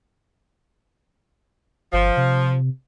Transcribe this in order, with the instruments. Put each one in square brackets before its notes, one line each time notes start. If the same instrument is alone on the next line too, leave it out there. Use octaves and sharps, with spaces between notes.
[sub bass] G1 [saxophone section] F3
[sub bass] C3